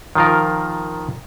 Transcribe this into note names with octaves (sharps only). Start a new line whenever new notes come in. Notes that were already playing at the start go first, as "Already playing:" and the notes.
D#3 F3 F4 A#4